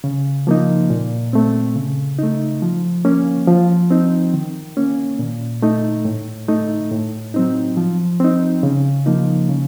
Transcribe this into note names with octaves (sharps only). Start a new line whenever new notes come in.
C#3
F3 A#3 D#4
A#2
A3 C4
C#3
A3 D#4
F3
A#3 C#4
F3
C4 D#4
D#3
A#3 C#4
A#2
A3 D#4
A2
A3 D#4
A2
F#3 C4 D#4
F3
C4 D#4
C#3
F3 A#3 D#4
C#3